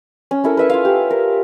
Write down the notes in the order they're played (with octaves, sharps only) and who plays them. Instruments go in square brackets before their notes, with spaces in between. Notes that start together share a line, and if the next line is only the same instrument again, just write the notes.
[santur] C#4
C#4 E4 A4 A#4
B4 E5 C#6
F4 E5 F5
G4
A#4